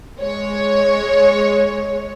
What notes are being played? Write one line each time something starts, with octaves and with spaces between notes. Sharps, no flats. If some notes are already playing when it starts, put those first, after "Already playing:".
G#3 C#5